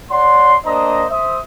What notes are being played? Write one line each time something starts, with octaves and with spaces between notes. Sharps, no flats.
C#5 D5 F#5 C6
A#3 D4 C5 D#5 A#5 D#6
C5 E5 D#6